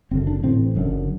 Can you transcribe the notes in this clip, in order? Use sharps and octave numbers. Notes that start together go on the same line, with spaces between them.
F#1 F#2 D3 C4
D4
A1 A2 C4
F#1 F#2 D3